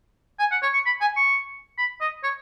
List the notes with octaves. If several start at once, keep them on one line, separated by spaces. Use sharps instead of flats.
G#5
F#5
C#5
C#6
B5
G#5
C#6
B5
D#5
C#5